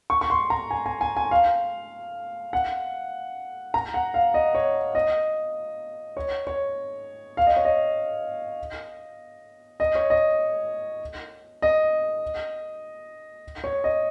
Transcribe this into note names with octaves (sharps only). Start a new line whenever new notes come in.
C#6
C#6
C6
A#5
G#5
G#5
G#5
G#5
F5
F#5
A#5
F#5
F5
D#5
C#5
D#5
C#5
C#5
F5
D#5
C#5
D#5
D#5
C#5
D#5
D#5
C#5
D#5